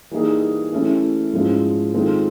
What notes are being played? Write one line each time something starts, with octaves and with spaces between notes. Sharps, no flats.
E3 G3 A#3 D#4 G#4
E3 A3 C#4 E4 G4
G#2 F3 G#3 C#4 E4
D#3 G#3 C4 F4 A4